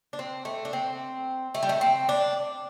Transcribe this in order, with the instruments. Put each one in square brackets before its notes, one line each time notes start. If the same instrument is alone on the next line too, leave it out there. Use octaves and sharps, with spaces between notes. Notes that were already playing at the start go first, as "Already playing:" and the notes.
[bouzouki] D4
C4
A3
D4
C4
A3
G3
A3
C4
D4